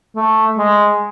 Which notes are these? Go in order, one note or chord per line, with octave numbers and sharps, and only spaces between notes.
A3
G#3